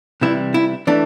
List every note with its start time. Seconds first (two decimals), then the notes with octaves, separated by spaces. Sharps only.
0.21 C3 E3 G3 E4
0.54 E4
0.87 E3 A3 D4